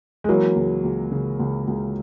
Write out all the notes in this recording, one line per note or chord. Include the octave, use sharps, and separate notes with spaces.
G#3
E3 F#3 A#3
C#2
C#2
C#3
C#2
C#2